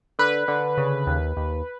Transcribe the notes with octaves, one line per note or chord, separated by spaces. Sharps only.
D3 B4
D3
C#3
D#2
D#2